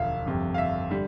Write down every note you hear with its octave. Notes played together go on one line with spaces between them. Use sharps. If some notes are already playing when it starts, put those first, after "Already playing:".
Already playing: E1 D2 D3 F3 E5 F5
G1 F2 C3
F5
E5
D3 G3